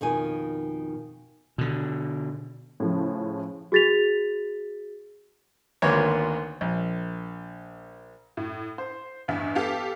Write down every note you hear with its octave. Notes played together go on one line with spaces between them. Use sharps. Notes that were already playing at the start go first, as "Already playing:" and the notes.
F2 B2 D#3 G#5
B2 D3
A2 C#3 F3
F#4 G#4 A6 B6 F7
G#1 D2 A#3 B4 C#5
A#1
A2
C5
A1 E2 G2 E5
B3 G4 A4 F5